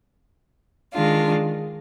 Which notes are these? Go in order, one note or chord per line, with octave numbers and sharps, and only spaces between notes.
D#3 G#3 D4 F4